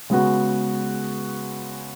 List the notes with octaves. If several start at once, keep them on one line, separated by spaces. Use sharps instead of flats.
C#3 G#3 B3 F#4